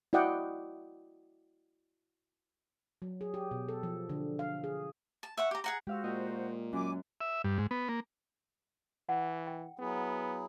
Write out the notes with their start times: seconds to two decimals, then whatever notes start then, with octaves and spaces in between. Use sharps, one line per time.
0.13 E4 F#4 D5 D#5 F#5 G5
3.02 F#3
3.21 G#4
3.34 G4
3.51 B2
3.69 A4
3.83 F3
4.09 D3
4.39 F5
4.64 G#4
5.23 A5
5.37 E5 F#5 C#6
5.51 G4 A#5
5.64 G#4 F#5 A#5
5.87 G#3 F#4 G4 C5 F5 E6
6.04 A#2 G4 A#4 D#5
6.73 F#2 C#4 G#5 D6
7.21 E5
7.44 G2
7.58 G#2
7.71 B3
7.89 A#3
9.09 E3 F#5
9.47 G5
9.79 F#3 B3 E4 G#4